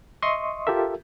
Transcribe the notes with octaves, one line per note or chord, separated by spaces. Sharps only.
D#5 E5 C6 C#6 D#6
F4 G4 A4 A#4 E5